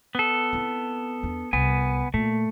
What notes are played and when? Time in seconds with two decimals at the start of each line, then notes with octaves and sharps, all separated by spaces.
0.15 B3 A4
0.53 C4 E4
1.23 E2 D4
1.53 C2 B3 G#5
2.14 A#2 A3